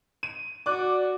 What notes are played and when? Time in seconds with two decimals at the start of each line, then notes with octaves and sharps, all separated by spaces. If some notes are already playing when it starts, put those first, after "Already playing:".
0.23 D#7
0.66 F#4 D5 D6 F#6